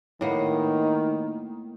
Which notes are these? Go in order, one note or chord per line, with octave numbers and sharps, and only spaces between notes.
A2 D#3 A#3 B3